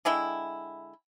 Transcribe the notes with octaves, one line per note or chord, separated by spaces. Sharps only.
D3 G#3 E4 G5